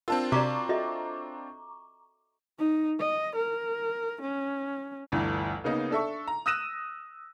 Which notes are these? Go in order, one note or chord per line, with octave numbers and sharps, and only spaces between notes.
C4 D4 F4 A#4 A5
C3 F#4 D5 A#5 C#6 D6 B6 E7
F#4 A4 D#5 E5
D#4
D#5
A#4
C#4
G1 D2 E3
C#3 A#3 B3 D#4
D4 A4 E5 C#6
A#5
D#6 E6 F#6 A#6 D#7 E7